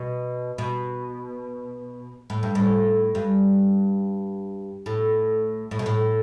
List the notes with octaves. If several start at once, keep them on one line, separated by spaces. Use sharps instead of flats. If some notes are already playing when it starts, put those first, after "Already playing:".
Already playing: B2
B2
A2
G2
A2
G2
A2
A2
B2
A2